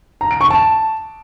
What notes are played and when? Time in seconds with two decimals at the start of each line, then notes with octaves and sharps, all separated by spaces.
0.21 A#5
0.31 D7
0.41 C#6
0.50 A5